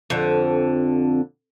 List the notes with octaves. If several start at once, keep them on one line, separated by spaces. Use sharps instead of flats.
F2 D3